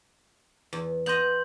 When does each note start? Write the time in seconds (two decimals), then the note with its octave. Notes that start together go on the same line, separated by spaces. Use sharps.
0.73 E2
1.06 B3 D#5 C6 G6 F#7